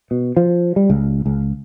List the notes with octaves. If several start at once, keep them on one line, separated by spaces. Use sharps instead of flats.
B2
F3
G3
C#2
C#2